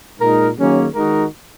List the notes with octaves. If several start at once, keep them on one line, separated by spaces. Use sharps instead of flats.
A#2 G#3 D#4 A#4
D#3 F#3 A#3 C#4 G#4
D#3 G#3 D#4 F#4 A#4